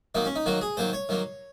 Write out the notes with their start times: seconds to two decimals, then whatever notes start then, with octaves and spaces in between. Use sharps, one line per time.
0.15 D#3 F#3 A#3 D#4
0.25 C#4
0.36 D#4
0.46 D#3 F#3 A#3 F#4
0.61 G#4
0.77 D#3 F#3 A#3 C5
0.93 C#5
1.09 D#3 F#3 A#3